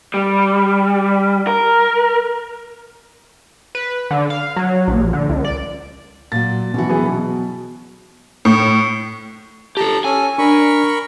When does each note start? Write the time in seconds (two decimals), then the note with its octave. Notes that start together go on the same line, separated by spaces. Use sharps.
0.14 G3
1.47 A#4
3.75 B4
4.11 D3
4.30 F5
4.56 F#3
4.88 A#1
5.13 D3
5.29 C#2
5.45 D5
6.32 A#2 F#3 A6
6.74 B2 E3 F#3 F#4
6.89 E3 B3 G#4
7.09 B2
8.45 A2
9.77 G4 A4 A5 A#5
10.04 C#4 A4 G#5
10.38 D4 A#4 B5 C#6